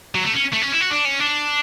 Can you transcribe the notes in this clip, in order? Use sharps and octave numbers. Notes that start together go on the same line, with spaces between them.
F#3
A3
C#4
A3
C#4
E4
F#4
D4
C#4
D4